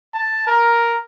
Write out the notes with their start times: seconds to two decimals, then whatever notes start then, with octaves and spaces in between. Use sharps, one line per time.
0.14 A5
0.47 A#4